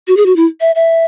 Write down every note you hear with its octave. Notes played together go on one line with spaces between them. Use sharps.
F#4
G#4
F#4
E4
E5
E5